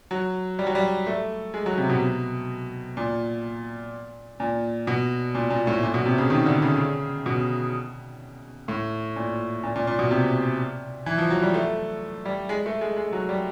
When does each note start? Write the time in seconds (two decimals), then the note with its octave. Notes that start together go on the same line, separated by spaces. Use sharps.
0.11 F#3
0.59 G3
0.67 F#3
0.75 G3
1.06 A3
1.54 G#3
1.66 F#3
1.78 C3
1.89 B2
2.97 A#2
4.40 A#2
4.87 B2
5.35 A#2
5.50 A#2
5.67 A2
5.83 A#2
5.94 B2
6.06 C3
6.18 C#3
6.30 D#3
6.46 D3
6.62 C#3
6.77 C#3
7.26 B2
8.68 A2
9.16 A#2
9.63 A#2
9.76 A#2
9.87 A#2
9.99 B2
10.11 C3
11.06 E3
11.18 F3
11.30 F#3
11.42 G3
11.54 A3
12.25 G3
12.49 G#3
12.66 A3
12.81 G#3
12.96 G#3
13.12 F#3
13.29 G3